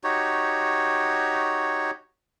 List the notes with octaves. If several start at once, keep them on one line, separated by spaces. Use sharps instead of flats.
D#4 F#4 G4 C#5